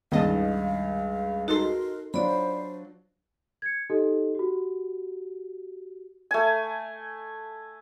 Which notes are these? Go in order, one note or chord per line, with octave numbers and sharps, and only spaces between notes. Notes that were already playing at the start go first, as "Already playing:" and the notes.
C#2 G2 D#3 D#5 F5 A5
D#4 F#4 A4 A#4 C6
F#3 D4 F4 C5 D5 B5
G#6 C#7
D#4 G4 A4 D#5
F#4 G4
A3 G#5